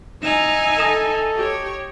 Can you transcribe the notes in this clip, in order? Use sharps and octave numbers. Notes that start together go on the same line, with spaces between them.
D#4 E5 G#5 E7 F7
A4 D#6 A#6 E7
G4 C#5